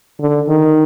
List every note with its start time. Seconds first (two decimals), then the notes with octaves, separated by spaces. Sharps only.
0.20 D3
0.48 D#3